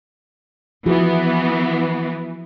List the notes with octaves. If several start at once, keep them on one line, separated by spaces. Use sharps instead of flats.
E3 F3 B3 F#4 G#4